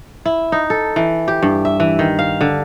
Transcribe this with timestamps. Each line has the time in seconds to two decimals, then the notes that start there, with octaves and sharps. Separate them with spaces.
0.25 E4
0.52 D#4
0.70 A4
0.96 E3
1.28 G4
1.43 G2
1.65 E5
1.80 E3
1.99 D#3
2.19 F5
2.41 D3